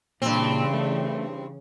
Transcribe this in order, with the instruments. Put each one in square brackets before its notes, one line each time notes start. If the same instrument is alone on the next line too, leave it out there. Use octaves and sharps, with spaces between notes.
[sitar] G2 C4 [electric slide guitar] A#2 [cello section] C#3 E3
[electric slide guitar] A3